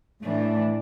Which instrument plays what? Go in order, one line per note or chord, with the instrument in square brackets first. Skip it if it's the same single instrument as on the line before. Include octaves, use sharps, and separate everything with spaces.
[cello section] A2 E3 D4 [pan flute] A3